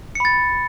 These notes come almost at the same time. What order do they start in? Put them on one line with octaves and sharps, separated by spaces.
C#7 B5 A6